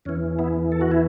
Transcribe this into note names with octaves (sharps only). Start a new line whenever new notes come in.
E2 E3 C#4
B3 E4
A4
F#4
E4